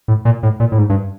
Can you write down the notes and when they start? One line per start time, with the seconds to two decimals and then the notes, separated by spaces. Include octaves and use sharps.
0.08 A2
0.25 A#2
0.43 A2
0.60 A#2
0.72 A2
0.78 G#2
0.89 G2